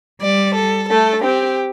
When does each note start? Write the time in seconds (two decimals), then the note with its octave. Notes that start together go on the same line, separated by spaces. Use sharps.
0.21 G3 D5
0.55 A4
0.89 A3 A4
1.22 C4 G4